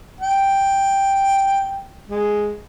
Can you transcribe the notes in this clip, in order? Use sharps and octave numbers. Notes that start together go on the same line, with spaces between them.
G5
G#3